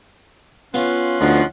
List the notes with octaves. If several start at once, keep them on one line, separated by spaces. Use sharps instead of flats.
B3 C#4 F4 C6 F#6
D2 F3 D#4 F#5